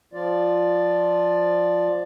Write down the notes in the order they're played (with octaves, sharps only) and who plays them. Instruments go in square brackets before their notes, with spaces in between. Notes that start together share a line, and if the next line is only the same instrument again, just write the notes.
[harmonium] F3 F4 D5